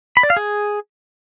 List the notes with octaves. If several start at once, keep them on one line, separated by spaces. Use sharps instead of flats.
B5
D5
F5
G#4